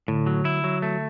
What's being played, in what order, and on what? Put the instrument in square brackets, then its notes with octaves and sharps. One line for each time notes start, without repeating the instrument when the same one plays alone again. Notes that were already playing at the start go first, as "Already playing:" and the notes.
[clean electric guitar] A2 [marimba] D3
[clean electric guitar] F#3
E4
F#3
A3